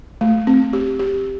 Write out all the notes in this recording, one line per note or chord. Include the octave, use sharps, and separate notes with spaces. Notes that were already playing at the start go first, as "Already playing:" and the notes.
A3
C4
G4
G4